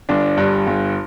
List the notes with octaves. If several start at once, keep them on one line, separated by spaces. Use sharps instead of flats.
G1 D4
G2
G1